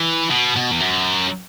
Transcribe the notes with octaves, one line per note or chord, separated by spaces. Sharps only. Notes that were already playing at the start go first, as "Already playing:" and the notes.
Already playing: E3
B2
B2
E2
F#2